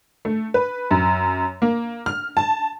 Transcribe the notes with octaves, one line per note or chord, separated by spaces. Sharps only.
A3
B4
F#2
A#3
F6
A5